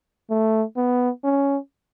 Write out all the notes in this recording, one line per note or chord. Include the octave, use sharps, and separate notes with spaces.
A3
B3
C#4